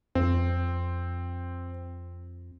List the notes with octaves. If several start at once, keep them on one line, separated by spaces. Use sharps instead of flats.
F2 C4